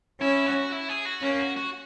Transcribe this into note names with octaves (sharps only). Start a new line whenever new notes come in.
C#4 E4
F#4
E4
G#4
F#4
A#3 C#4
F#4
F#4